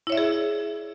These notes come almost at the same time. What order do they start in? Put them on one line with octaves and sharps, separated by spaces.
E4 C#5 E5 D5 G#4